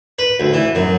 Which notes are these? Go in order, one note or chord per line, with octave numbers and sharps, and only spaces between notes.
B4
D2
E3
F#2